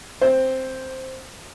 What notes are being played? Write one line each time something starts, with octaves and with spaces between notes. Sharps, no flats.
C4 C5